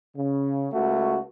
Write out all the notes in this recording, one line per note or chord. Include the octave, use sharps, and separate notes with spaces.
C#3
C#2 A3 F#4